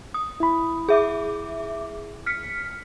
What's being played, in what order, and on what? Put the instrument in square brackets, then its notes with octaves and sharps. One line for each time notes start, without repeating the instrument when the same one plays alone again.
[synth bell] D#6
[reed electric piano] E4 B5
[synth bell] G#4 E5 D6
F6 B6 C#7